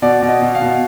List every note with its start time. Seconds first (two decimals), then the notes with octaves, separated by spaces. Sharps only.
0.02 B2 D5
0.22 B2
0.29 D#5
0.42 B2
0.55 F5
0.61 B2